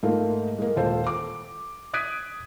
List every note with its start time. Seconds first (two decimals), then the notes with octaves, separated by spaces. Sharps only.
0.03 G#2 A3 A#3 F4
0.58 G#3 A#3
0.76 D#1 F4 A4 C5
1.07 D6
1.94 D#6 F#6 G#6 B6 D7 D#7